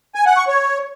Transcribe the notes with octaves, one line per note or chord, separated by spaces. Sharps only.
G#5
F#5
C#6
C#5